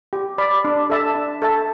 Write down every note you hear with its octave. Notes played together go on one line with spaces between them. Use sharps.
G4
D5 B5
D4
A4 E5 A5
D4
A4 E5 A5